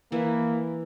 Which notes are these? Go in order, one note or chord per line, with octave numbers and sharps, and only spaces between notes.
E3 A#3 E4